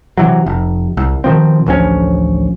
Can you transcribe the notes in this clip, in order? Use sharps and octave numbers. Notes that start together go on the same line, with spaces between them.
C3 E3 F#3
F1
C2
B2 D#3 F3 C4
A1 D2 F3 C#4